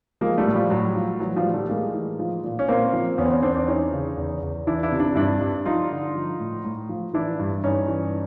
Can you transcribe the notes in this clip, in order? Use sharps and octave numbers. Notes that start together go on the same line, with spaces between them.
F3 G#3 A#3
G3 A3
A2
F3 G3
A2 F#3
F3
E3 F#3
F3 G3
A2
G3 A3
A2 G#3 A#3
E3
F3
A#2
C#4
A#2 A#3 C4
F3
E2 B3 C#4
C4
B3 C#4
E2 C4 D4
C4 D4
E3 C#4 D#4
C#3
E2
E2
E3 D4 E4
D4 E4
C3
D4 E4
G2 D4 E4
G2
F3 D#4 F4
D3
F3
A2
A2
F3
E3 D4 E4
G2
G2 C#4 D#4
E3